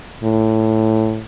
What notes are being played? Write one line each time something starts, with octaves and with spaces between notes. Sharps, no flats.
A2